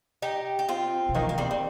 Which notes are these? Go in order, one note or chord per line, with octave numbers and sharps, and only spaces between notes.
D#4 G4
G4
C4 F4
C3
D#3 A#3 D#4
A#3
G3 C4
G3